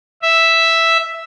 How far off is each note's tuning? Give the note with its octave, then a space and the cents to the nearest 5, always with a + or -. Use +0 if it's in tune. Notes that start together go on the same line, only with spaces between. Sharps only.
E5 +0